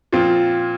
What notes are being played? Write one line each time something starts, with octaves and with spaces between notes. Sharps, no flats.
A#2 F3 C4 F4